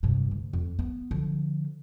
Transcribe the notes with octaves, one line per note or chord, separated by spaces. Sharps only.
G2 C3
D2
F2
B3
D3 F3